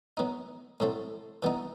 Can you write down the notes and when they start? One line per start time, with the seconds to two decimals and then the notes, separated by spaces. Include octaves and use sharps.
0.17 F#3 B3 D#4
0.80 A2 F#3 A3 C4
1.43 E3 G3 B3 D#4